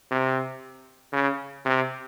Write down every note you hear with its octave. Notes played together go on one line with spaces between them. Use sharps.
C3
C#3
C3